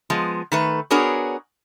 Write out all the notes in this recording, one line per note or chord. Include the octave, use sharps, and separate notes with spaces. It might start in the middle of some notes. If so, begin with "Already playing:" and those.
F3 G#3 B3
D#3 A3 B4
B3 D4 F#4 G#4 A#4 C#5